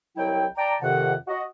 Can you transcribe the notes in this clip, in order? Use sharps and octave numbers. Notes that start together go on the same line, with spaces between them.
C2 D#3 F#3 E4 G5
D5 G5 A5 A#5
F2 C3 D#3 F#5
F#4 D#5